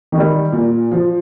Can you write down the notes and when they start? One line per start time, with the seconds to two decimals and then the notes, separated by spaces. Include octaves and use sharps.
0.12 D#3
0.18 G3
0.52 A#2
0.91 F3